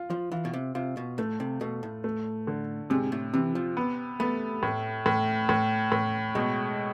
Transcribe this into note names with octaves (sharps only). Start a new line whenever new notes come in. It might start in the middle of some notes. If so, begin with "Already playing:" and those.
Already playing: F4
F3
E3 F4
B2
C3
C3 F4
B2
A2 A3
C3
B2 A3
A2
A3
D3
G#2 C3
A2
C3 E3
F3
B3
A3 B3
A2
A2
A2
A2
B2 G#3